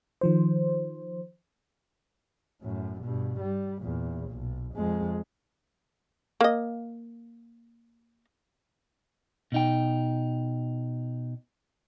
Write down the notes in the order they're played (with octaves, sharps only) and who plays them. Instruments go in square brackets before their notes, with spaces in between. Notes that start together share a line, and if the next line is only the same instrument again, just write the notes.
[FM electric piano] D#3 F3 C5
[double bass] F#2 A2
G2 B2
G3
E2 A#2
B1
F2 G#3
[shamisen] A#3 D#5
[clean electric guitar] B2 D#4 G5